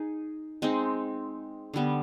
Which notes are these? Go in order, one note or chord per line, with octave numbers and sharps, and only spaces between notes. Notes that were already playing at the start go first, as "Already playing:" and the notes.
Already playing: D#4 G#4
G#3 C4 D#4
D3 G3 B3